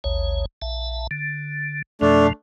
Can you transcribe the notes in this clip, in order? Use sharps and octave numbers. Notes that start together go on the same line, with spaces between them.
A1 D#2 C#5
A#1 E5 A5
D3
F2 B2 F3 A3 D4